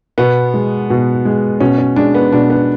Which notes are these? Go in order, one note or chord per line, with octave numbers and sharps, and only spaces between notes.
B2 B3
G#3
B2
G#3
B2 C#4
C#4
G#3 D4
B3
B2 D4
B3